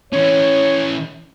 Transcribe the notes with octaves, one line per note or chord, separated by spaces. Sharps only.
E3 C#4 C#5